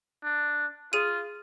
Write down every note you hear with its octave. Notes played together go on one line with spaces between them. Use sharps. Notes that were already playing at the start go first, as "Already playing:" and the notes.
D4
F4 G#4 D#7